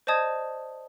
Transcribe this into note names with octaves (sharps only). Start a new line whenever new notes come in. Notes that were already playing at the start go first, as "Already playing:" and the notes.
C5 D5 D#5 A5 D#6 G#6